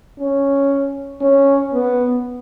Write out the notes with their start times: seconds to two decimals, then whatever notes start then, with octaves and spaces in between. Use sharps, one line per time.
0.19 C#4
1.21 C#4
1.73 B3